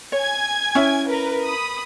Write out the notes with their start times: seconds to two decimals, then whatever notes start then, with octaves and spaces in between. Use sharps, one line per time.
0.12 C#5 G#5 G#6
0.75 C#4 E4
1.07 A#4 B4
1.44 B5 D#6